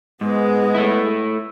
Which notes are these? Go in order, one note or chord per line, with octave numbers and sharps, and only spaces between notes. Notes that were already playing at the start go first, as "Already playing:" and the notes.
G#2 G#3 B3
A3 E4